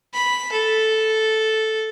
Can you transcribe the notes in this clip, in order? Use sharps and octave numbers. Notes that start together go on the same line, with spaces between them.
B5
A4